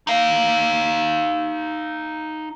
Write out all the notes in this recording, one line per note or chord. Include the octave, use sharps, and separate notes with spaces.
D#4 F5